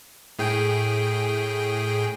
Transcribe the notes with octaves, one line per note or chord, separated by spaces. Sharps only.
A2 G#4 G5